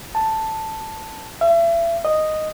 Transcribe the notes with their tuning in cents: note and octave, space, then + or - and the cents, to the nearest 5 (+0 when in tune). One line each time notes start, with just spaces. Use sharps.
A5 +5
E5 +35
D#5 -5